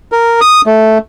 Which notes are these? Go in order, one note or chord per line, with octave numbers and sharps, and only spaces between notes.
A#4
D#6
A3